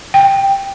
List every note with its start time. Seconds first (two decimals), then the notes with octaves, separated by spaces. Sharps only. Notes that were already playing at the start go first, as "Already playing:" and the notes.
0.14 G5